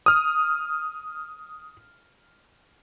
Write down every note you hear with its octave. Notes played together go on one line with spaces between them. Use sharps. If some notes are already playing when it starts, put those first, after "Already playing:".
D#6 F6